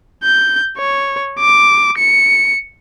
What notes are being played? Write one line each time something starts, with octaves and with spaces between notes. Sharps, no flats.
G6
C#5
D6
C#7